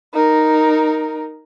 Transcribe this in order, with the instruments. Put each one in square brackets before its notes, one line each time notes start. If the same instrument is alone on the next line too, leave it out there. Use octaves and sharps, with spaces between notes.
[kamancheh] D#4 A#4